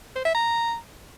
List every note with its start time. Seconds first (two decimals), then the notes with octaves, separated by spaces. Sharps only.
0.15 C5
0.25 E5
0.34 A#5